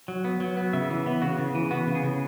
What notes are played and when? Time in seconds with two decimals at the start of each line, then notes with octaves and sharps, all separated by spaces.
0.08 F#3
0.24 B3
0.40 F#3
0.57 B3
0.73 C#3 E5
0.90 E3
1.06 B3
1.22 C#3 F#4
1.38 C#3
1.55 E3
1.71 B3 F#4
1.87 C#3
1.95 G#4
2.03 C#3